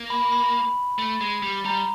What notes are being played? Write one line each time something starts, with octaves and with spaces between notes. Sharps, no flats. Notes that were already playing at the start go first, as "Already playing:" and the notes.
Already playing: A#3
B5
B5
A3
G#3
G3
G3 A#5